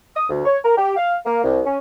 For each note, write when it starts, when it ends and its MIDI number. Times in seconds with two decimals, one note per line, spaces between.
0.16 0.24 87
0.29 0.41 38
0.45 0.57 73
0.64 0.76 70
0.76 0.95 67
0.96 1.15 77
1.25 1.41 58
1.43 1.60 36
1.65 1.78 61